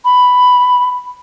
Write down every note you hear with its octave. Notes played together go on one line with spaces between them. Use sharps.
B5